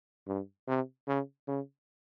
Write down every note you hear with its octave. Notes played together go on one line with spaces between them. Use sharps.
G2
C3
C#3
C#3